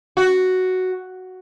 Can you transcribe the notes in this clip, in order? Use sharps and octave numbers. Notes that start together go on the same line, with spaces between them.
F#4